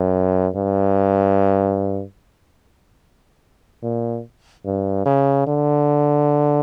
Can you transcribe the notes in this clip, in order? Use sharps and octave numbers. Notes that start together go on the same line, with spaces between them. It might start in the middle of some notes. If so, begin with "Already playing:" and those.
Already playing: F#2
G2
A#2
G2
C#3
D3